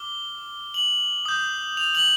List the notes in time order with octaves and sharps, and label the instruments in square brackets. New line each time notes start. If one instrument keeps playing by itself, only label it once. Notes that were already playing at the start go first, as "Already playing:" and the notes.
Already playing: [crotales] D6 F6 G7
F#7
D#6 G6
F7
F#7